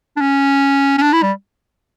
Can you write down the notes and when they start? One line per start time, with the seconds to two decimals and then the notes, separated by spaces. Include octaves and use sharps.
0.16 D4
0.21 C#4
0.98 C#4
1.02 D4
1.13 E4
1.23 G3